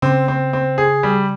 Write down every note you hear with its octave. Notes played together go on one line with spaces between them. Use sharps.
C#3 C4
C4
C4
G#4
G3